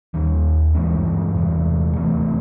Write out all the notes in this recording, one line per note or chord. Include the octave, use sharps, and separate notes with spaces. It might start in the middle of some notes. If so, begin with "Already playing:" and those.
D#2 D#3 G3
G2 E3 G#3 C#4
E2 C3 E3
C3 E3 A3 C4